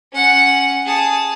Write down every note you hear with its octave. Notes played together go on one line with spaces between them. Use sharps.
C#4 F#5
G#4 A5